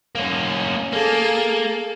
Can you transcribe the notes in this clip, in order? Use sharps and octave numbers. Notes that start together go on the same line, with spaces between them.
A#3 C#4
A#3 G#4 A4